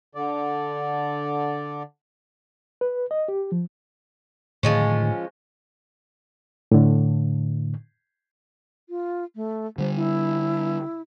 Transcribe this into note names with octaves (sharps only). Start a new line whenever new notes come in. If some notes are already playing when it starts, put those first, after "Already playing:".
D3 D5
B4
D#5
G4
F3
A2 D3 D#3 F3 G#3 C#4
A2 D3
F4
A3
D3 G3 C5
E4